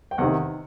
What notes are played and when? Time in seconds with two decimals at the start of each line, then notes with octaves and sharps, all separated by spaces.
0.11 G5
0.18 E2 C3 D#3 F#5